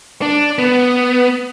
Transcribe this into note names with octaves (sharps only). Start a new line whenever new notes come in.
D4
B3